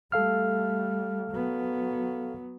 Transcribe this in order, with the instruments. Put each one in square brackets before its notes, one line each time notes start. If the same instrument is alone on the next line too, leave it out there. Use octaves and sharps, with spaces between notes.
[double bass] G3 A3 [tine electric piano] A4 F5 F6
[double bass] F#3 B3